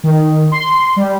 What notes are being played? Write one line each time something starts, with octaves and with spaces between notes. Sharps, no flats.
D#3
C6
G3